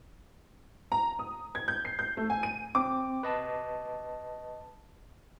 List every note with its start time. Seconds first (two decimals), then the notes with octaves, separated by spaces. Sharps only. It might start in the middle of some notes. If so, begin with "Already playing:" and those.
0.92 A#5
1.19 D#6
1.55 G#6
1.68 G6
1.85 C7
1.99 G6
2.17 A3
2.30 G#5
2.43 D#7
2.75 C4 D6
3.23 B4 D#5 A5